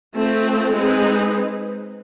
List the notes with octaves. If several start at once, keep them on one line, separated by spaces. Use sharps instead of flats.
A3 C4 F4
G#3 C4 D#4 G#4 B4